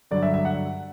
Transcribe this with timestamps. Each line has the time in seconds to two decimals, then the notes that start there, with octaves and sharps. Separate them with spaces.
0.11 G2 D3 F#3 D5
0.23 E5
0.34 E5
0.45 F#5